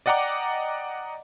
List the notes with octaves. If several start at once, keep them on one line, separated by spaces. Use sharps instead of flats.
D5 D#5 F#5 G5 A#5 D6